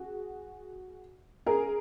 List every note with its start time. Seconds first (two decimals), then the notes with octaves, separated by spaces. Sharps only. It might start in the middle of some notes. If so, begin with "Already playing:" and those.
Already playing: F#4 G#4
1.46 G#4 A#4